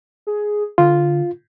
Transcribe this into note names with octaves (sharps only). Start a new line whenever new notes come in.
G#4
D3 F4